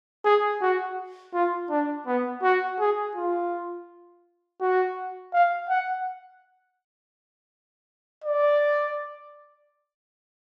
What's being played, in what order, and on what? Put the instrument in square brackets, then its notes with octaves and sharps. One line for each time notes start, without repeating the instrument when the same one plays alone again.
[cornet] G#4
F#4
F4
D4
B3
F#4
G#4
F4
F#4
F5
F#5
D5